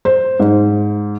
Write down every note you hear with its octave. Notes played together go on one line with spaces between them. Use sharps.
C5
G#2